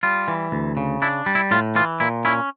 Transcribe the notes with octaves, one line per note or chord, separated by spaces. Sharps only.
G3 F4
E3
D2
C#3
D4 E4
G3
E4
A2 F4
E3 F4
A#2 E4
C#4 E4